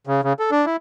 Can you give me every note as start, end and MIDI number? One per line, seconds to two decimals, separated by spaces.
0.07 0.21 49
0.24 0.33 49
0.39 0.51 69
0.51 0.66 62
0.66 0.76 64